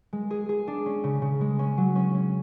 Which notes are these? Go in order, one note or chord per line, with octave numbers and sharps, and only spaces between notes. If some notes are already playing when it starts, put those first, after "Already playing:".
G#3
G#4
G#4
D4
C#4
C#3
C#3
G#3
C#4
F#3
C#4
C#4